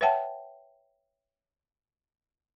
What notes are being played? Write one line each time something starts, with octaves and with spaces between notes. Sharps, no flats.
B4 C#5 E5 F#5 G5 A5